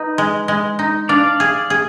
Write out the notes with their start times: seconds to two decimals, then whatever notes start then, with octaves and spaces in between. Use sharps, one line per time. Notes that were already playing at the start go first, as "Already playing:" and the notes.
Already playing: D#4 B4
0.18 G#3
0.48 G#3
0.79 D#4
1.09 D4 D5 F5
1.40 G#4
1.70 G#4